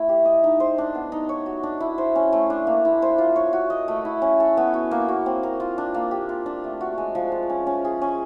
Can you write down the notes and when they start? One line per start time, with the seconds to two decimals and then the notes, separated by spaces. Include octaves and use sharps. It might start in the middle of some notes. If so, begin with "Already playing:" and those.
Already playing: A3 E4
0.09 G4
0.25 D#5
0.44 D#4
0.60 C5
0.78 D4
0.95 B3
1.12 D#4
1.29 C#5
1.46 F#4
1.63 D4
1.80 E4
1.98 C5
2.15 C#4
2.32 A3
2.50 D4
2.67 A#3
2.85 E4
3.02 C5
3.18 F4
3.36 C#5
3.53 F#4
3.70 D#5
3.88 A3
4.05 E4
4.22 C#4
4.40 A4
4.57 B3
4.74 F#4
4.91 A#3
5.08 F#4
5.26 C4
5.43 A#4
5.60 F4
5.78 D4
5.94 A#3
6.11 G4
6.29 F4
6.46 D4
6.64 A3
6.81 F#4
6.98 G#3
7.15 F3
7.32 F4
7.50 C#4
7.67 C#4
7.85 G#4
8.02 C#4